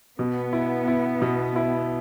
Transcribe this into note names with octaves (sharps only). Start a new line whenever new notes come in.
B2 B3
E4
E4
B2
E4